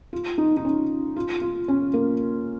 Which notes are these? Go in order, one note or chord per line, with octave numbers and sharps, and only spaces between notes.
F4
D#4
D#4
C#4
F4
F4
C#4
A#3